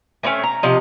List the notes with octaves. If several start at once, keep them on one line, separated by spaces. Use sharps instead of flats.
A3 A#3 C4 C#4
A#5
C3 F3 D#5